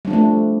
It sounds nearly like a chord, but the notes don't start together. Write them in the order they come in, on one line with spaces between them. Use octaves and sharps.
G3 D4 F3 A3